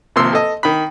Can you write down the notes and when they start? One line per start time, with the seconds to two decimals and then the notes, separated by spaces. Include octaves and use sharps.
0.16 G#1 C3 F3 A#3 C6 E6
0.33 A4 D#5
0.63 D#3 B5